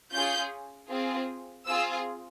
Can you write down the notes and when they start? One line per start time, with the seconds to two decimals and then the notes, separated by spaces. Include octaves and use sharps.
0.13 C#4 F4 G#4 G6
0.90 C4 F4 G#4
1.68 C4 F4 G#4 E6